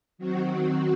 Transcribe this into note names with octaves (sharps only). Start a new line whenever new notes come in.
D#3 F#3 C4 F#4